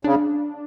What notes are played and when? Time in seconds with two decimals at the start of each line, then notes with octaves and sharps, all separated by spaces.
0.04 C#3 D4